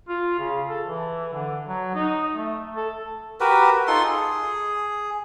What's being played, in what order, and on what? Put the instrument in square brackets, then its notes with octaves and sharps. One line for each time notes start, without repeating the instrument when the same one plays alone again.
[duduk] F4
C#3
A4
E3
D3
F#3
D#4
A3
A4
[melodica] F#4 G4 A#4 B4
D#4 F4 A4 C6
G#4